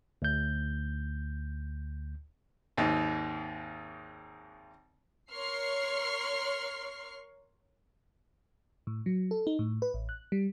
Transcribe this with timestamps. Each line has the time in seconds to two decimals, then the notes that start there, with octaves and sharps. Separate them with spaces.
0.22 D2 G6
2.77 G#1 D#2 G#2
5.32 A#4 C#5 C6 C#6 F6 C7
8.87 A2
9.06 F#3
9.31 A4
9.47 D#4
9.59 A2
9.82 B4
9.94 A1
10.09 F#6
10.32 G3